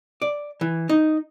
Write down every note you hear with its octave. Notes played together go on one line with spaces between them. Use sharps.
D5
E3
D#4